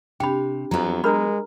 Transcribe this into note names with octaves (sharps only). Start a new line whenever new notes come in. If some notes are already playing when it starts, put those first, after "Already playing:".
C3 D4 G4 G5 B5
F2 F#3 B3 A#5
G#3 D4 A#4 A#5 B5 F6